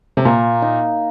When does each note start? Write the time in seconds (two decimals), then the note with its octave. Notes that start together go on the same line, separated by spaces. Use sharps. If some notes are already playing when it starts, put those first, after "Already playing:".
0.17 C3
0.25 A#2 A#3
0.62 D#4